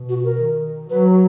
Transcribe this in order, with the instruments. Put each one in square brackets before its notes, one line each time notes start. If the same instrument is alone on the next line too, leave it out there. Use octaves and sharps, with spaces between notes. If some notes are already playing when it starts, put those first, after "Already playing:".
Already playing: [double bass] B2
[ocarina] F#4
A#4
[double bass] D#3
[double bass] F#3 [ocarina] B4